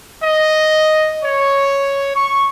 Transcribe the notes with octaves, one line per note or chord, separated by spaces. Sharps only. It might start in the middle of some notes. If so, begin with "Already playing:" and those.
D#5
C#5
C#6